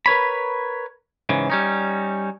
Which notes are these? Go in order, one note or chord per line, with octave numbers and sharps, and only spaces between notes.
A#4 B4 C#5 B5
G#2 C#3 E3
G3 C#4 D#4